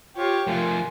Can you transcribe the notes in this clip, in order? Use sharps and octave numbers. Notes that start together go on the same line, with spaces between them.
F4 G4 C#5
F3 A3 F4 A#4 G#5